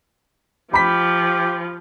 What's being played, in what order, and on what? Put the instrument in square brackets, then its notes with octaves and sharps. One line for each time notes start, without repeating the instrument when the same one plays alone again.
[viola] F3 [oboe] G4 [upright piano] B5 B6